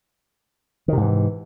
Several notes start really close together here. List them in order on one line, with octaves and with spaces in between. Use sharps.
D#3 C3 G#2 E3